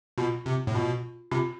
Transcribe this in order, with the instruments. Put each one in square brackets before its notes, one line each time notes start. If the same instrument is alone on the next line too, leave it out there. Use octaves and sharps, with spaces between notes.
[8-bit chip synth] B2 [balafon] F4
[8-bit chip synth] C3
A2
[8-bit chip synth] B2 [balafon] F4
[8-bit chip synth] C3 [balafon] F4